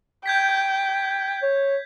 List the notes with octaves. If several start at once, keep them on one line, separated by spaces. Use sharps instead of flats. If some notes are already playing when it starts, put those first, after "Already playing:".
G5 G6 G#6 B6
C#5